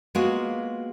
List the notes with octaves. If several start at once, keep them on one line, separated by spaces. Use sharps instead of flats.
G#3 A#3 B3 F4 F#4 G#4